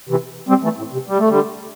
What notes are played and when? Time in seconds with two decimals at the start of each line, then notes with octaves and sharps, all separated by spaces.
0.09 C3 E3
0.49 G3 C4
0.63 E3 A3
0.78 A2
0.93 C3
1.08 G3
1.19 A3
1.28 D3 G3